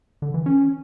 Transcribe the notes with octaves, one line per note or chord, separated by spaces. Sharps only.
D3
E3
C#4